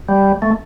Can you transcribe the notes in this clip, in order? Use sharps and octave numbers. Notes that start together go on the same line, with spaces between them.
G3
A3